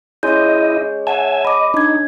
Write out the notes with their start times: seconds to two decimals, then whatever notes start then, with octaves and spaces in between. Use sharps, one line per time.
0.23 G#3 C#4 E4 D5 D#5 G6
1.07 C#5 E5 F#5 G#5 A5
1.45 D#5 B5 D6
1.74 D4 D#4 G#6